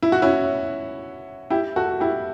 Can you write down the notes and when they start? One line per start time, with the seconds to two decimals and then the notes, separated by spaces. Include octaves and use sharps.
0.03 E4
0.12 F#4
0.22 C#4 E4
1.50 E4 G4
1.76 F#4 A4
2.00 E4 G4